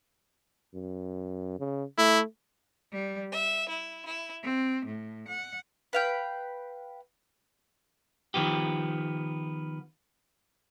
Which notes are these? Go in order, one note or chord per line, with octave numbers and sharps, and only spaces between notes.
F#2
C#3
A3 E4
G3
E5
E4
E4
C4
A2
F#5
B4 F5 G5
D#3 F3 B3 G4